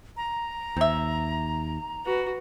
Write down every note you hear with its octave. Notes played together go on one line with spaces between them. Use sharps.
A#5
D#2 C4 E5
F#4 B4